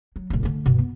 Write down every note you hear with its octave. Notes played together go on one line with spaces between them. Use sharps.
F#3
D2 A#2
D3 A3
G2 B2
B3